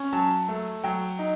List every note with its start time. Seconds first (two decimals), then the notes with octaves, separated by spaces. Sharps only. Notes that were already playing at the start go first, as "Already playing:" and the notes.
Already playing: C#4
0.13 F#3 A5
0.49 A3
0.84 F#3 G5
1.19 D#4